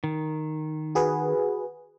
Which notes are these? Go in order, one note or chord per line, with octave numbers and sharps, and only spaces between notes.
D#3
F#4 G#4 B4